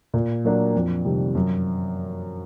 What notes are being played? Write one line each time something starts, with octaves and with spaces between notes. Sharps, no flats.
A#2
F#3 A#3 D4
F2
C3 D#3 G3
F#2